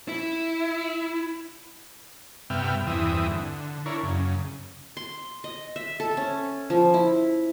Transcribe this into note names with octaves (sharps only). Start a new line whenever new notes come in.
E4
G2 C3 B3 E5 G5 F6
E2 G2 E3 C4 E5 D#6
D3
D4 E4 A#4 C#5
F#2 C#3
C6
D#5
E5
A4
C#4
F3
E4